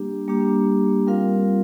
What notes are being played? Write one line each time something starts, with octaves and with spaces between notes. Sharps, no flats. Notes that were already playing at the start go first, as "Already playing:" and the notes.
Already playing: G3 A#3 D4 G4
G3 A#3 D4 G4
G3 C4 F4 A#4 F5